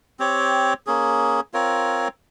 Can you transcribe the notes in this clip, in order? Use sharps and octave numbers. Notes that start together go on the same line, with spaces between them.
C4 G4 C#5
A#3 C#4 G#4
C4 F4 A#4 C#5